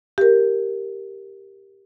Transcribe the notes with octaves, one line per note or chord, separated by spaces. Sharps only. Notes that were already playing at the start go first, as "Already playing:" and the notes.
G4 A#4